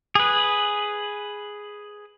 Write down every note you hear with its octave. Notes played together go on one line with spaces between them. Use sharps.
G#4 B4